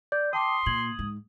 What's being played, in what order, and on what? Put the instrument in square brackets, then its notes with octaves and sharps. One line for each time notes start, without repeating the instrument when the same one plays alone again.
[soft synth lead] D5 [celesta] G6
[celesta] G5 A5 D6 [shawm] C6 [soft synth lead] D#6
[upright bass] A#2 [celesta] G#6 F#7
[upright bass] G#2